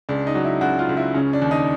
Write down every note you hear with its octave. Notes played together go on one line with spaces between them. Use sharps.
C#2 D4
D#4
F#3
E4
C#2 F#4
F4
C#2
E4
C#3 C#4
D4
D#2
D#4